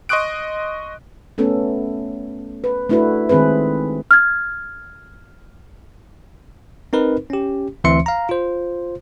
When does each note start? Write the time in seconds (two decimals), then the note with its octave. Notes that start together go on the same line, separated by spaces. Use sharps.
0.09 D#5 C6 C#6 D#6 F#6 D7
1.38 A3 B3 C#4 A4
2.64 B4
2.89 A3 D4 E4 F#4 B4
3.29 D#3 G#3 C4 G#4 B4
4.11 F6 G#6
6.93 C4 D#4 A#4 B4
7.30 C#4 G4
7.84 D2 E3 C4 E5 C6 C#7
8.06 F5 A#5
8.29 F4 C5